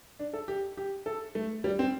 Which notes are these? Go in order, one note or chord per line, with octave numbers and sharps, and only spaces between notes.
D4
A4
G4
G4
A4
A3
G3
C4